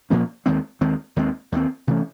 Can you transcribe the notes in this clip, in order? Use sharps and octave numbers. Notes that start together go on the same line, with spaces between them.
A#2 F3 A#3 C#4
D#2 D#3 G#3 C4
D#2 D#3 G#3 C4
D#2 D#3 G#3 C4
D#2 D#3 G#3 C4
C3 E3 A3 C#4